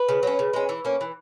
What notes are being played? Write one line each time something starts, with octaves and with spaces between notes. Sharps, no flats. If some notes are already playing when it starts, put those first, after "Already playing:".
Already playing: B4
C#3
F#3 C#4
C#3
G#3 C#4
E3
A#3 C#4
E3